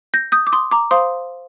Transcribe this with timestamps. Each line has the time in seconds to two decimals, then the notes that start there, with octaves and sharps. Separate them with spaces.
0.14 G6 A#6
0.32 D#6 G6
0.47 D6
0.52 C6 D#6
0.71 A#5 D6
0.91 C5 F5 C6 D#6